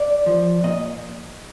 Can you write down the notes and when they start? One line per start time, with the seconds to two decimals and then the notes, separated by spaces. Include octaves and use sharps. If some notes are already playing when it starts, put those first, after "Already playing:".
Already playing: D5
0.26 F3
0.64 A#2 D#5